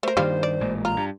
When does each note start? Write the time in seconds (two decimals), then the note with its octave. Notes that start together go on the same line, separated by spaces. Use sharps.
0.03 A3 A#4 C5
0.17 G2 D#3 G3 A#3 F4
0.43 D5
0.61 A1 A#2 G#3
0.85 F4 A#5
0.97 G2